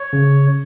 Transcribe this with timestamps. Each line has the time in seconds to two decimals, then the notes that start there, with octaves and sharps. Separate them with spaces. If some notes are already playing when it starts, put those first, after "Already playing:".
Already playing: C#5
0.13 C#3